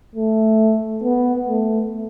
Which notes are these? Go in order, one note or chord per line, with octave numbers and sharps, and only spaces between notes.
A3
B3
A3